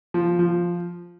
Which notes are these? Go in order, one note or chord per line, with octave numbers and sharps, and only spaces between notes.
F3
F3